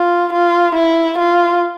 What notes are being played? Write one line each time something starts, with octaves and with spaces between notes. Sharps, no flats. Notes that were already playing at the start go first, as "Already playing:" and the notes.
Already playing: F4
F4
E4
F4